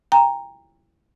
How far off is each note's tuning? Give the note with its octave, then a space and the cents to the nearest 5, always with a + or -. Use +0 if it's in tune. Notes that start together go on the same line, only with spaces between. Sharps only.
G5 +30 A#5 +0